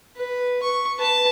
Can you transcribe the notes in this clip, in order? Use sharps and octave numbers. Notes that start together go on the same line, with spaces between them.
B4
C#6
B4 A5